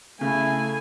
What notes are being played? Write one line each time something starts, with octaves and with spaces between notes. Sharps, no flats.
C#3 A3 E4 G#4 G#5